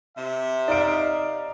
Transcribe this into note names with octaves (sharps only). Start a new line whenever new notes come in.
C3 E5
D#4 D5 F5 D7